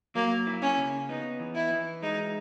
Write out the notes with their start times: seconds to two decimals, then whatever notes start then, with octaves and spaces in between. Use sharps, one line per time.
0.15 F#3 A#3
0.47 E4
0.62 C#4
0.78 C#3
1.09 B3 D#4
1.40 E3
1.55 E4
1.71 E3
2.02 G#3 D#4